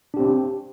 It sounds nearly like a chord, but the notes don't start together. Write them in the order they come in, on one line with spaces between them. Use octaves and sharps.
D4 G4 C4